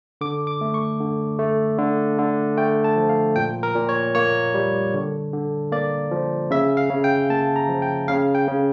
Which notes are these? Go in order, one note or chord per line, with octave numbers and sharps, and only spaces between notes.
D3 D6
D6
A3
C#6
D3
A3
D3
D3
A3 G5
A5
F3
F5
A#2 G5
A#4
A#2
C#5
A#3 C#5
G3
D3
D3
A#3 D5
F3
C#3 E5
F5
C#3
G5
A#3 A5
A#5
F3
G5
C#3 F5
G5
C#3